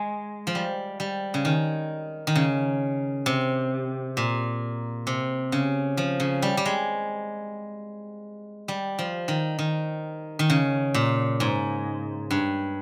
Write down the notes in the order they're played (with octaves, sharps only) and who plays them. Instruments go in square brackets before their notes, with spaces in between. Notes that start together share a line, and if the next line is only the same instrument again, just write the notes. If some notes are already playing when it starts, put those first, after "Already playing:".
Already playing: [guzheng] G#3
F3
G3
G3
C#3
D#3
D#3
C#3
C3
A#2
C3
C#3
F3
C#3
G3
G3
G#3
G3
F3
D#3
D#3
D#3
C#3
A#2
G#2
G2